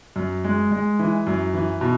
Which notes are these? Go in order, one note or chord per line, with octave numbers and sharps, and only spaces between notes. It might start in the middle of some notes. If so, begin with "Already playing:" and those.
F#2
G#3
G#3
E3
F#2
E3
B2